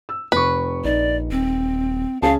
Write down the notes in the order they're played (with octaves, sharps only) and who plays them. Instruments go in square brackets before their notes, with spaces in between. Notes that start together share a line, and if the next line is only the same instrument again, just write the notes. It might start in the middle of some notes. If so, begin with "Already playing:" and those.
[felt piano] E6
[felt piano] F1 C#6 [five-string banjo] B4
[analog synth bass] A#1 [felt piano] D#4 [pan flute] D5
[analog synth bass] D#1 [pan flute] C4
[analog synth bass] C#2 [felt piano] C#4 G#4 A5 [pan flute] F5